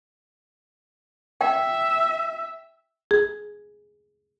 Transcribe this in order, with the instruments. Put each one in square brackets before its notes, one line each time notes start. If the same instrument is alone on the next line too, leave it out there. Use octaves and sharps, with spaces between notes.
[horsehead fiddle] E5 [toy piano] G5
[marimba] G#4